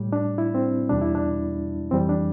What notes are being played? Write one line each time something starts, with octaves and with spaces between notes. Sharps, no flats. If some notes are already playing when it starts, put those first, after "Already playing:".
Already playing: A2 G3
D4
E4
C4
E2 B2 G3 D4
E4
D4
F2 E3 G3 C4
D4